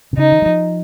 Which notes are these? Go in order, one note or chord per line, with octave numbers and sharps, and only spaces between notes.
C3
C#3 D#4
D#3
G3
F3